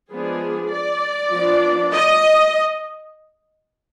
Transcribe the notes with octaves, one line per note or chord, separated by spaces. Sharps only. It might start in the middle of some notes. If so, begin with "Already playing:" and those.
F3 G#3 B3 D4 G#4
D5
F3 B3 D4
D#5